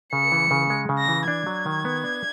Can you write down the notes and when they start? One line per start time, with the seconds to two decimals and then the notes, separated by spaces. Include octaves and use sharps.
0.13 C#3 C#7
0.32 E3
0.51 C#3
0.70 G#3
0.89 C#3
0.99 A#6
1.08 E3
1.27 D4 G#6
1.47 F#3
1.66 D#3
1.85 B3
2.04 D4